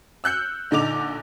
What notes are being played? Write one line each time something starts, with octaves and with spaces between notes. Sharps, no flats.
E6 F#6 G6 C#7
A#1 D3 D#4 D6 F7